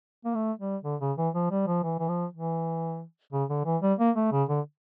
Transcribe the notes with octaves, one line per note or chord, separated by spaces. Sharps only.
A#3
A3
G3
D3
C#3
E3
F3
G3
F3
E3
E3
F3
E3
C#3
D3
E3
G3
A#3
A3
C#3
D3